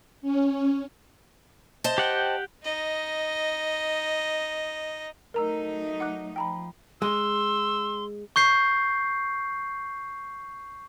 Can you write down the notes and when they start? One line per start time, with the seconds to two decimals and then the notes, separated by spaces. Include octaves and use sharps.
0.22 C#4
1.84 C5 D#5 A5
1.98 G4 F#5 G5
2.63 D#4 D#5
5.34 F#3 A3 D#4 A#4 A#5 E6
6.00 F#5 D6 F#6
6.36 F3 G5 A#5 B5
7.02 G#3 C6 E6
8.36 C#6 G6 C7